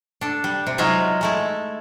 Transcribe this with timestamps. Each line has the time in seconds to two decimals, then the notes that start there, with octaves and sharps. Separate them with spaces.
0.21 D4 A4
0.44 G3
0.67 C3
0.78 F#3 G#3 D#4 F4 E5
1.21 G#3 A3 E4